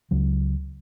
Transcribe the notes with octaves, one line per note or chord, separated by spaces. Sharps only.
C#2 C#3 F#3